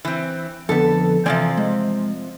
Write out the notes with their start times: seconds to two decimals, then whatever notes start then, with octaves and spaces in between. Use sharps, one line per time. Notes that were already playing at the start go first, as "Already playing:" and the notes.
0.05 E3 C4
0.69 F2 D3 B3 A4
1.26 C3 E3 F3 C4 D5 G#5
1.57 G#3